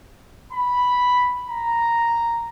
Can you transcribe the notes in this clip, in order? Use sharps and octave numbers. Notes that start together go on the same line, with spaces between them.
B5
A#5